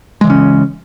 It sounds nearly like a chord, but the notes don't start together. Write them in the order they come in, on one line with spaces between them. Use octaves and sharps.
G#3 E3 C#3 C#4